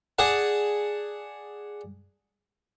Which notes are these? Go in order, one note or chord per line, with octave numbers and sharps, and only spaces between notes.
G#4 D5 F#5 A5